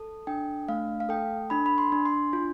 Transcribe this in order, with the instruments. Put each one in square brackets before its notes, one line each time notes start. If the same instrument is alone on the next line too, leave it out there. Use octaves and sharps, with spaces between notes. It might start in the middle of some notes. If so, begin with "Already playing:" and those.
Already playing: [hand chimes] A4
D4 G5
A3 F5
F5
A4 G5
D4 B5
B5
C6
D4
C6
F4